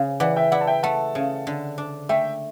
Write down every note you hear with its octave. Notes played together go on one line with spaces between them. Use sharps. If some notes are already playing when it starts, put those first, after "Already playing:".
Already playing: C#3 C#4
E3 D5 F#5
E5 G5
E4 D5 F#5
A5
E5 G5
A3 F#5 A5
C#3
D3
D4
A3 E5 G5